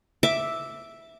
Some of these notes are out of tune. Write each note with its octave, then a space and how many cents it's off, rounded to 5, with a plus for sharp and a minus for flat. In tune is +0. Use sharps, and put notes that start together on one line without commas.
E5 +0 D6 +0